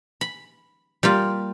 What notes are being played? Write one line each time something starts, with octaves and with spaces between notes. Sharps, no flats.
B5
G3 A#3 F4